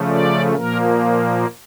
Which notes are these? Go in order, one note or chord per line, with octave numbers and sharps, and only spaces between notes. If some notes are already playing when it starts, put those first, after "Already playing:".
Already playing: C#3 F3 A3
D5
A#2 F3 A#3 A#4